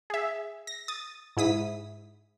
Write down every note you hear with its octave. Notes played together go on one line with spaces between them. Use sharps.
G#4 E5
A#6
D#6 A6
G#2 E4 D#6 B6